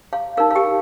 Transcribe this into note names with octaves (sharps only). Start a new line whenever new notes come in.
F5
D#4 A#4 F5
F5
G4 G5